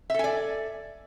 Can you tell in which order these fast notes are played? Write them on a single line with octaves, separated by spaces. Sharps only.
E5 A4 G#5 D5